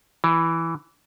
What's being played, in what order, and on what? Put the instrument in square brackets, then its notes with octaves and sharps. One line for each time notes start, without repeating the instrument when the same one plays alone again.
[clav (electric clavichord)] E3